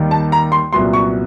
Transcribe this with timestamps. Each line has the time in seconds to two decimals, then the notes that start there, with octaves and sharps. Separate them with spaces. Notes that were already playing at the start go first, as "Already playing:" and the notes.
Already playing: D#2 D#3 G3
0.11 A5
0.32 A#5
0.52 C6
0.73 C2 A#2 F#3 B3 C6
0.93 C#6